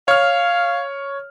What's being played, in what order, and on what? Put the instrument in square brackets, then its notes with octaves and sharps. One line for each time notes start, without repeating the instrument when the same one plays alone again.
[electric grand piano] C#5 F6 [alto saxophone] F5